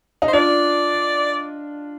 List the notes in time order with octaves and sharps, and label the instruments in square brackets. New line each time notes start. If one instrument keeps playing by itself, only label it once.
[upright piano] D#4
[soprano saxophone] C5
[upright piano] D4 F4 [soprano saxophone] D5